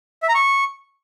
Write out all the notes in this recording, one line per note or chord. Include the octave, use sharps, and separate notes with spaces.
E5
A#5
C#6